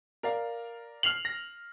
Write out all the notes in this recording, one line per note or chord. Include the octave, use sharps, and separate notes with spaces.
A#4 D5 F5
F6 C7 F7 F#7
A#6